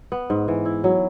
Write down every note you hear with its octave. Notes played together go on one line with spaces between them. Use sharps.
B3
G#2
E3
E4
F#3